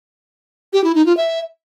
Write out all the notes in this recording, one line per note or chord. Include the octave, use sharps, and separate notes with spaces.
G4
E4
D#4
F4
E5